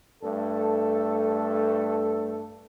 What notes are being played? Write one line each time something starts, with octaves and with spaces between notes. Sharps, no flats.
G2 A3 A4